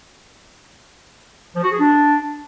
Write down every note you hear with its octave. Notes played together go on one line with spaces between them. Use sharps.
F3
F#4
G#4
D4